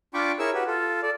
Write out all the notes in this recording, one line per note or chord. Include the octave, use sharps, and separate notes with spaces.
D4 F4 G5 B5 C#6 D6
E4 G#4 A#4 C#5 C#6 E6
F#4 G4 B4
F4 A4
A4 D5